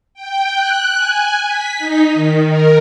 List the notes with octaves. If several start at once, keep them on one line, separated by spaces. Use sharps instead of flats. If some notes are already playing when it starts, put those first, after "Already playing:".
G5
F#6
G#5
B6
D#4
D#3
A#4